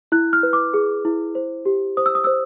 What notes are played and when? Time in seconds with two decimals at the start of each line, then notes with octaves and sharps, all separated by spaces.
0.12 E4 F#6
0.33 F6
0.43 B4
0.53 D6
0.74 G#4
1.05 E4
1.35 C5
1.66 G4
1.97 C5 D#6
2.06 E6
2.15 D#6
2.24 C5 E6